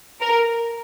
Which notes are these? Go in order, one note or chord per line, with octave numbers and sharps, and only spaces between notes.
A#4